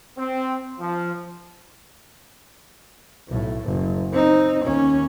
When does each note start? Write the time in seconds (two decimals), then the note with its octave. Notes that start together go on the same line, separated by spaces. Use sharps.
0.17 C4
0.80 F3
3.28 B1 A2
3.64 F#1
4.12 C4 D#4
4.63 D#2 C#4